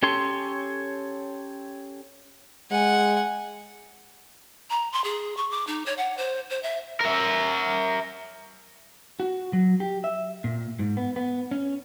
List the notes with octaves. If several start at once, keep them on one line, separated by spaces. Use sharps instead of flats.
C#4 G4 A4 C#5 C6
G#3 F#5 G#5
A#5
C6
G#4
C#6
D6
D#4
C#5
F#5
C5
C5
E5
A#4 E5
F#4
F#3
G4
E5
A#2
G#2
B3
B3
C#4